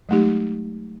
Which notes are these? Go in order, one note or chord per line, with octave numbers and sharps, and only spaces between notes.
F#3 G#3 A3 D#4 G4